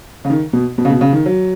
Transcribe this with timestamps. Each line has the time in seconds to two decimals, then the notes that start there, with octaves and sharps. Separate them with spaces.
0.25 C#3
0.30 D#3
0.53 B2
0.78 B2
0.85 C#3
0.90 B2
1.01 C#3
1.13 D#3
1.26 F#3